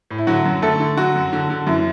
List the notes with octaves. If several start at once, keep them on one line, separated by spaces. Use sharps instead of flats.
A2
E4
D3 F#3 F#4
F#2
D3 A3 A4
D3
D3 F#3 F#4
F#2
D3
D3
F#2 E3 E4